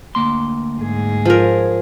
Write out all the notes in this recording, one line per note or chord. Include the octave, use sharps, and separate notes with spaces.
D2 A#3 C6
G#2 G#4
F3 A#4